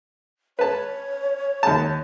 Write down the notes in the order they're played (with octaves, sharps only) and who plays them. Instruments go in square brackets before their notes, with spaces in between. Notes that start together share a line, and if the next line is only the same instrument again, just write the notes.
[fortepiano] B4 A5 [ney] C#5
[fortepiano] D#2 A5